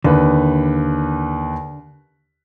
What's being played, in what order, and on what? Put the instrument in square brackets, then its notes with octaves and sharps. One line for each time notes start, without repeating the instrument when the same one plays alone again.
[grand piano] D#2 B4 [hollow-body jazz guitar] D3